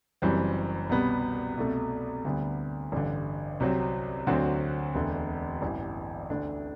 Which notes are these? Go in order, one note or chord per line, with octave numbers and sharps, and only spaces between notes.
F#1 F#2 E3 G3 C4
C2 B2 G3 B3
C2 B2 A3
D2 D3 G3 B3
A1 G2 D3
C2 C3 F#3 C4
D2 D3 F#3 C4 F#4
E1 D2 D3
A1 G2 E3
D2 D3 A3 D4